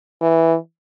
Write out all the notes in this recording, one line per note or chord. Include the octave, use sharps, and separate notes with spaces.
E3